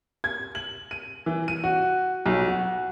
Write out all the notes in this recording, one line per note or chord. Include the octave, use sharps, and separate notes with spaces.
G#6
F#7
D#7
E3
D#7
F#4
B1
F#4